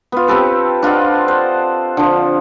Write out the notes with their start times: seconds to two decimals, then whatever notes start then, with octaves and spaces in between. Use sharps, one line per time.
0.12 B3 F4
0.28 C4 G4 A4 B4
0.82 D4 F4 D#5 F#5
1.28 C5
1.97 D3 F3